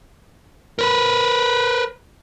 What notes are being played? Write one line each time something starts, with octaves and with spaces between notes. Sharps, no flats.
A#4 B4